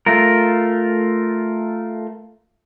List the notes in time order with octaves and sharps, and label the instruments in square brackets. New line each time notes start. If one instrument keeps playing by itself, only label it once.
[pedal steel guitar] A3 F4 A#4